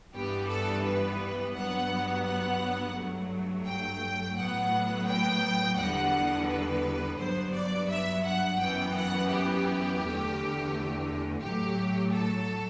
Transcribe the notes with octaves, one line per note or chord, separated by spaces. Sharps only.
G2 E3 G3 B3 G4
A4
B4
G2 F#3 B3 F#5
F#5
G2 F#3 A3
G5
A2 F#3 B3 F#5
G5
E2 D3 G3 B3 F#5
B4
G2 F#3 B3 C5
D5
E5
F#5
F#2 E3 B3 G5
F#5
G4
E2 D3 A3
A2 F#3 A3 G4
A4